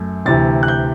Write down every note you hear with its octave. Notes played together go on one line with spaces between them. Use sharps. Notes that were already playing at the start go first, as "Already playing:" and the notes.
Already playing: F#2 A3
D2 C3 E3 A6
F#6
G6